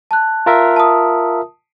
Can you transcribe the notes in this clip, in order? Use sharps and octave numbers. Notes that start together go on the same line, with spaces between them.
A5 F#6
F4 A#4 E5
A5 D#6